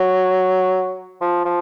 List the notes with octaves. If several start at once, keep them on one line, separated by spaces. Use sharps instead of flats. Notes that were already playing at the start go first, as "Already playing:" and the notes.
Already playing: F#3
F3
F3